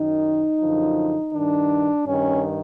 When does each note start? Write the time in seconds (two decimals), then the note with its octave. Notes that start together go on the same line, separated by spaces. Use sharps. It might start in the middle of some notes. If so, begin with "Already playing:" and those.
Already playing: F#2 D#3 D#4
0.60 F#2 D3 F3
1.32 G2 D#3 D4
2.05 G2 D#3 C#4